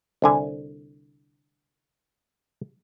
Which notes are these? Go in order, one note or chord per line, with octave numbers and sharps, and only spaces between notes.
C2 D3 G#5